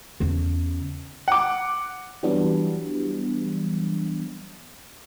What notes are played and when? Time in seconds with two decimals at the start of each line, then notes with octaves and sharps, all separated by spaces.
0.20 E2 C#3
1.28 F#5 D6
2.23 E3 F#3 G3 B3 D4